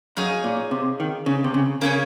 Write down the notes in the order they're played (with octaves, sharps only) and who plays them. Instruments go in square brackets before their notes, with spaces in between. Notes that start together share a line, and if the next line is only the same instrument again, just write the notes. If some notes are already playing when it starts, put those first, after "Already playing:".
[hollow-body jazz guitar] F#2 [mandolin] D#4 G#4 C#5 F5
[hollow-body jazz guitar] A#2
C3
D#3
C#3
C3
C#3
[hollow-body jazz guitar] C#3 [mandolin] A#3 C#4 G#4 C#5